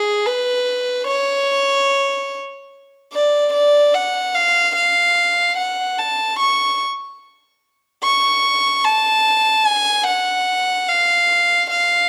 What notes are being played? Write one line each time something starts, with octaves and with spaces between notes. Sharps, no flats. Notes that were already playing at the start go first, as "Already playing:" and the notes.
Already playing: G#4
B4
C#5
D5
D5
F#5
F5
F5
F#5
A5
C#6
C#6
A5
G#5
F#5
F5
F5